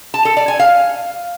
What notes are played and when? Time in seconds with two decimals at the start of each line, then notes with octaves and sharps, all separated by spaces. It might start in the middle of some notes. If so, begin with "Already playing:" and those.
0.14 A5
0.25 A4
0.37 D5
0.48 G#5
0.59 F5